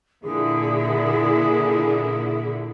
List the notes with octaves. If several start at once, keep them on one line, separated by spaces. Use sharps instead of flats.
A#2 D3 E4 G#4